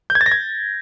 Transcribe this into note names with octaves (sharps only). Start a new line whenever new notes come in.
G6
G#6
A6
A#6
G#6